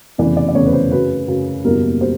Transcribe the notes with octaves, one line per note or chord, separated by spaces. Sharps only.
F1 E2 C#3 E3 D5
D5
D5
F1 E2 C#3 E3 C#5
B4
C5
F#2 C#3 F#3 B4
F#2 C#3 F#3
F#1 E2 B2 G3 A#3 A#4
B2 G3 C5